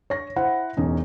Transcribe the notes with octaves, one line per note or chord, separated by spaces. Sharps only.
C#5 A#6
E4 C5 F#5
E1 C#4 D#4